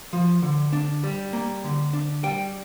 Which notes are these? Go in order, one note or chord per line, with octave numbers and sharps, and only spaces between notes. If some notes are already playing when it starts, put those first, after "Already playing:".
F3
D3
D4
G3
A#3
D3
D4
G3 G5